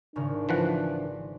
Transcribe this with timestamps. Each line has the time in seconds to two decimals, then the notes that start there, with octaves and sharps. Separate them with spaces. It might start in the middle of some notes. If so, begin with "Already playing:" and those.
0.16 G#1 C#3 D4 A#4
0.49 E3 F3 F#5